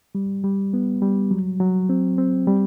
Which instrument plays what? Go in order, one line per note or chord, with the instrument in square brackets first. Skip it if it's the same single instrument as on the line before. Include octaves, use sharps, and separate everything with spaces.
[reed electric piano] G3
G3
B3
G3
F#3
F#3
C4
C4
G3